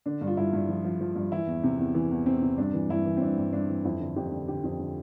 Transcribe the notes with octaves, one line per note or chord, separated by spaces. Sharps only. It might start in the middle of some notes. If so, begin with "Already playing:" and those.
D3 D4
G2
F4
G2 E4
G2
F3
F3
F3
G2
E3 E4
E2
C3
E2
E3
E2
E2 C4
C3
G2 D4
E3
G2 E4
E3
C4
G2 D4
G2
G2 D4
E3
F2 E4
D3
F2 G4
D3
D3 G4
F2
D3